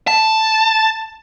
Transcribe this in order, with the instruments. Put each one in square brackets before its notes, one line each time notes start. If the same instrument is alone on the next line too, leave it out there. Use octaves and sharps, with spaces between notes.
[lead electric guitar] A5